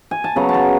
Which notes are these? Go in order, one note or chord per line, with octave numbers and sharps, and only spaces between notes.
G#5
A5
C#3 F#3 B3 A#5
A5
A#5